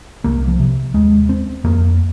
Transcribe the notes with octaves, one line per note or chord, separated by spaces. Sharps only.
C2 A#3
F3
C3
D#2 G#3
C4
F2 A#3